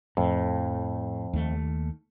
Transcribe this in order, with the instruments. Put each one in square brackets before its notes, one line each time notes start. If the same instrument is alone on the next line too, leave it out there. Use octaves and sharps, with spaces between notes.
[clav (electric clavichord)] F2 [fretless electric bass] A2
[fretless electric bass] D#2 A3